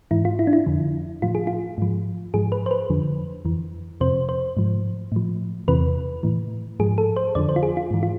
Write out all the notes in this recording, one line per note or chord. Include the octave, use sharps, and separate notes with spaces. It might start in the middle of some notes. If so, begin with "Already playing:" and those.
G#2 E3 E4
F4
E4
D4
E4
F2 D3 F3
A2 F3 F4
G#4
F4
G#2 F3
G#2 F3 G#4
B4
C5
B4
F2 D3 F3
F2 E3
F2 C3 F3 C5
C5
G#2 F3
A2 F3
E2 C3 E3 B4
A2 E3
G#2 F3 G#4
A4
C5
F2 D3 F3 D5
C5
F4
G#4
F4
G#2 E3
F4